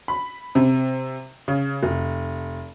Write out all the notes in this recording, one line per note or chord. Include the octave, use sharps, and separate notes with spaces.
B5
C3
C#3
F1